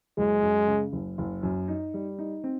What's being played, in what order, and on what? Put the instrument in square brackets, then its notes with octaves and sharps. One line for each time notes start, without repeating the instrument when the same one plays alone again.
[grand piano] F#1 [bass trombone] G#3
[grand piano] F#2
C#3
F#1
F#1
F#2
D#4
G3
D#4
C4